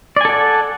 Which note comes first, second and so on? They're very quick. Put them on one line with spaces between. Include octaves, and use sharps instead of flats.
D5 G#5 A4 F#5